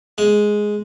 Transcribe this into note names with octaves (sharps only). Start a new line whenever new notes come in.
G#3